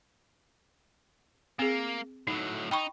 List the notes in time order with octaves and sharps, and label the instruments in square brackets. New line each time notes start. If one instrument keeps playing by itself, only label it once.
[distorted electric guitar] A#3 [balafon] C4 G#4
[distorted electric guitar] A2 F#3 [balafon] D#4
[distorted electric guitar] D#4 [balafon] G5 B5 C#6